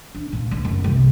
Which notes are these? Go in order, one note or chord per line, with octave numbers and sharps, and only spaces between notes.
D4
A#2
D2
F#1
C2